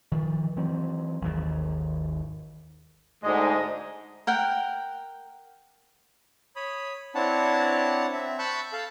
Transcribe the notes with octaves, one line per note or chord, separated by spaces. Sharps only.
D#3 F3
E3 F#3 C4
G#1 D#2
D2 G#2 G#3 D#5
A#4 F#5 G5
C#5 B5 D#6
C4 D4 E4 C#5 F#5 A5
C4 E5
A5 B5 C#6 E6 F#6 G6
A4 F5 A5